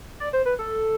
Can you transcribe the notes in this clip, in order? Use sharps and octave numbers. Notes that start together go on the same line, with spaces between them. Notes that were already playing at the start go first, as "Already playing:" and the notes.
D5
C5
B4
A4